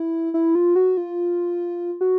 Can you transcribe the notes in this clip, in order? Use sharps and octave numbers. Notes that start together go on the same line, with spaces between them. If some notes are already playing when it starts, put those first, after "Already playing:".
Already playing: E4
E4
F4
F#4
F4
F#4